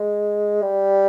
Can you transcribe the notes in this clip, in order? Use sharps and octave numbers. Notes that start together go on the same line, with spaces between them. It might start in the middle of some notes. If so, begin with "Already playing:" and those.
Already playing: G#3
G3